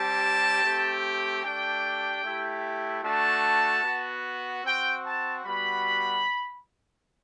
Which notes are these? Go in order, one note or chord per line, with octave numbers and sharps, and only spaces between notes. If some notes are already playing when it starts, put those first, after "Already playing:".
Already playing: G3 C4 G4 A5
A3 C4 G4
A3 D4 G4 G5
A3 E4 G4
A3 D4 F#4 A5
B3 F#4
C4 F#4 G5
A5
G3 B3 F#4 B5